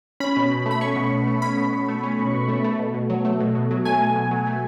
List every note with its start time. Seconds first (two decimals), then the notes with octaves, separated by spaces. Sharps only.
0.20 C#4 B5
0.36 B2
0.51 B2
0.66 A3
0.71 B5
0.81 C#4 C#6
0.96 B2
1.12 B2
1.27 A3
1.42 C#4 B5
1.57 B2
1.73 B2
1.88 A3
2.03 C#4
2.19 B2
2.34 B2
2.48 A3
2.64 A3
2.79 B2
2.94 B2
3.10 F#3
3.25 A3
3.40 B2
3.55 B2
3.71 F#3
3.85 A3 G#5
4.01 B2
4.16 B2
4.31 F#3
4.47 A3